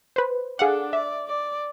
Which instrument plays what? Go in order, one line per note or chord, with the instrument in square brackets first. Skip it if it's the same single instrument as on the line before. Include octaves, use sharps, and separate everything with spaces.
[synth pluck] B4 C5
[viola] D4 A4 [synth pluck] G#4 F5 F#5
[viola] D5 [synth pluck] E5
[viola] D5